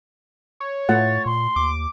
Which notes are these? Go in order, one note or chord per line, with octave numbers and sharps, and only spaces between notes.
C#5
A2 A3 F4 F#5 A6
A#2 C6
D#2 D6